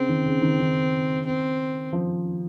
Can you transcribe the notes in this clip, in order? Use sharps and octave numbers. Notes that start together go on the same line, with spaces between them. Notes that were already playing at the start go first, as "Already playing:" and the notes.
Already playing: C#3 C4
D#3
C#3
D#3
D#3
C4
F3